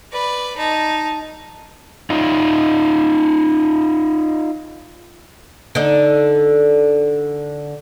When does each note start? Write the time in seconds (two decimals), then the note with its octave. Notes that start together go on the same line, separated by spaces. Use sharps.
0.12 B4 D5
0.57 D#4 A5
2.10 D#4 F4
5.75 D3 D#4